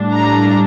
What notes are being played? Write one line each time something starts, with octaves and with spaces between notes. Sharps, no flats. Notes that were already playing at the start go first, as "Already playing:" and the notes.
Already playing: A2 G3 D4
A#5